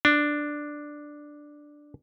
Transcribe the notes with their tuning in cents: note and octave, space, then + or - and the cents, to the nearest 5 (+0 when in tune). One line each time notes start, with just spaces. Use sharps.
D4 +5